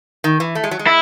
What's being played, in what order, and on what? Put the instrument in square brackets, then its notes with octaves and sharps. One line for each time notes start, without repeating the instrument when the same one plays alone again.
[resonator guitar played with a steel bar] D#3
E3
A3
G#3
F#3
G#3
[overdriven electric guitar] E4